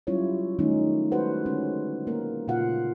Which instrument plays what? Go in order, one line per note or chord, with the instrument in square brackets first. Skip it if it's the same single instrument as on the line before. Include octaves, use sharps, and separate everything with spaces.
[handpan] F#3 G3 C#4 E4 F4 C#5
D#3 G3 A3 C#4 D#4
G#3 F#4 A4 B4 C5 F#5
D3 G#3 C#4
A#3 A#4
A#2 C#3 A#3 F4 F5 F#5